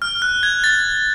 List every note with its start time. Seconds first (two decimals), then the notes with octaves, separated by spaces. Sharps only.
0.02 F6
0.22 F#6
0.43 G#6
0.64 A6